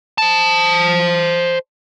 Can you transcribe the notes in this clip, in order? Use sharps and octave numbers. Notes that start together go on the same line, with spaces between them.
C5 A5